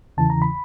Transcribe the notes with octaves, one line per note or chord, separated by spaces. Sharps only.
E2 C#3 E3 A5
A#5
B5